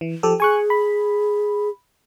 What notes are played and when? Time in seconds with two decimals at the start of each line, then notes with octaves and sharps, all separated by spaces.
0.01 E3
0.23 F3 G4 A4
0.40 G#4 G#5 C#6 F#6
0.70 B5